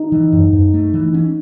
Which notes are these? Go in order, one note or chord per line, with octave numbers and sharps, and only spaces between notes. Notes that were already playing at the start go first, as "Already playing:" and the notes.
Already playing: D#4
E3
F#2
F#2
A3
E3
C#4